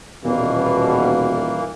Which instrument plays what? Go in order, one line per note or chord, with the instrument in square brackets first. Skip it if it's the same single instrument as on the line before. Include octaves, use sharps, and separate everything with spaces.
[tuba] D#1 [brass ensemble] B2 [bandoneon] E3 A#3